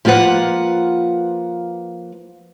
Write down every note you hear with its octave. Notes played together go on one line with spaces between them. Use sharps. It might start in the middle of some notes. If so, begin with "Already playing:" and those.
F3 A#3 F4 B4 F#5